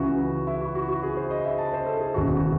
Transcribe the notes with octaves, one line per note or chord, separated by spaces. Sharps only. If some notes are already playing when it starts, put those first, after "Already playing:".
Already playing: C#2 C#3 E3 F#4
E4
F#4
F#4
F#4
G#4
C5
D#5
E5
A5
C5
A4
G#4
E1 D#2 C#3 E3 F#4
F#4